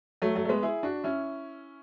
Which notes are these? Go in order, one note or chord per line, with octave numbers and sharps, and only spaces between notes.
F#3 A3
F#3 A3
A3
G#3 B3
E4 G#4
D4 F#4
C#4 E4